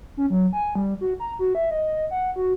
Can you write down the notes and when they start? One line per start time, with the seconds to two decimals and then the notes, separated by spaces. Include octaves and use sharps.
0.17 C#4
0.30 F#3
0.53 G#5
0.75 G3
1.01 F#4
1.20 A#5
1.39 F#4
1.55 E5
1.71 D#5
2.11 F#5
2.36 F#4